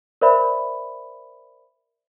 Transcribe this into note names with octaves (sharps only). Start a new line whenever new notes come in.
A#4 C5 D5 E5 B5